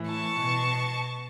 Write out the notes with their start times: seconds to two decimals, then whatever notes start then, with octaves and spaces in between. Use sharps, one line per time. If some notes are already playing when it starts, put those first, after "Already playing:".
Already playing: A2 E3
0.09 A5 C#6
0.40 B2